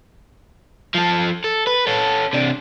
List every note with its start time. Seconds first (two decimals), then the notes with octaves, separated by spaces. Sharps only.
0.95 F3 A4
1.44 A4
1.67 B4
1.87 C#4 A4
2.33 C3 D4